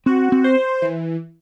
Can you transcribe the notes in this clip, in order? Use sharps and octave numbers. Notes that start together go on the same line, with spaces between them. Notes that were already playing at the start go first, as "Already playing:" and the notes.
C4 F#4
C4
C5
E3